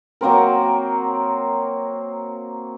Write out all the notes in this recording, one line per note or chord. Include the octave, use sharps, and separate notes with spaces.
F#3 A#3 C4 A#4